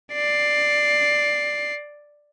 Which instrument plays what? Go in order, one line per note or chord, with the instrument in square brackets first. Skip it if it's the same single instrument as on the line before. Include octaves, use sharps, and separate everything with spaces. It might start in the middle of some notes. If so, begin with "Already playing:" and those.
[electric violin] D5 C7